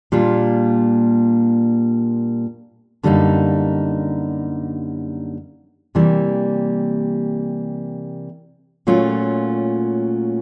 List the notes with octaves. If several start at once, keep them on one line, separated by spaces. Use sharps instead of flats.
A#2 G3 A#3 D4 F4
F#2 D3 G3 A#3 D#4
C3 E3 G3 A#3
A#2 F#3 A3 C#4 F4